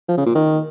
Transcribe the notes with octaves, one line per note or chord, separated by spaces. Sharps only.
F3
C#3
A#2
D#3